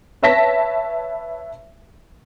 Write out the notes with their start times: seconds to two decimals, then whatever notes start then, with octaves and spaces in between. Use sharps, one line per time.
0.22 B4 C#5 E5 A5 A#6 B6